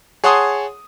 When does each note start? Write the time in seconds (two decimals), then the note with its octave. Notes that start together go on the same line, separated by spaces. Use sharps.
0.24 G#4 C#5 F#5 A5 C6 D#6